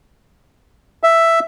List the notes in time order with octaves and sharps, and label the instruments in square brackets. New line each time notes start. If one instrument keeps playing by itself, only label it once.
[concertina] E5